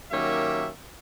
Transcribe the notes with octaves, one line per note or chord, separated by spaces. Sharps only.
D#3 F#3 A#3 C#4 G4 E5